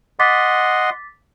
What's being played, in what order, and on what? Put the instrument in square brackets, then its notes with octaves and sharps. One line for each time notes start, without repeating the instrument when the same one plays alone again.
[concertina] D#5 F#5 C6 [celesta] D6 A6 B6